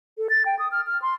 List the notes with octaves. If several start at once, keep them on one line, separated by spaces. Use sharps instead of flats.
A4
A6
G5
D#6
F6
F6
C6